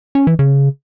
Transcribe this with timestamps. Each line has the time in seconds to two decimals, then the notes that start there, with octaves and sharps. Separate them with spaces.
0.15 C#4
0.27 E3
0.39 C#3